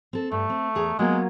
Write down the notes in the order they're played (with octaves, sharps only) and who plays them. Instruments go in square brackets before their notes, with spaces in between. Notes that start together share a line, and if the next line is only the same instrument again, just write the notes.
[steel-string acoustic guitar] C4 A4
[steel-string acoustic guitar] G2 [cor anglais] A3
[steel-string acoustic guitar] C4
E2 G#4 A#5
[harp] F#3 A#3 F4 [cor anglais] G#3 [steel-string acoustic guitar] B3